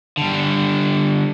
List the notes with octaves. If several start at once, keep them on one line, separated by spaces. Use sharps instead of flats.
D3 G3